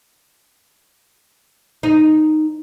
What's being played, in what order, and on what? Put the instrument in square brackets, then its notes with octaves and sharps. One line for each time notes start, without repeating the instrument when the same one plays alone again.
[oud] D#4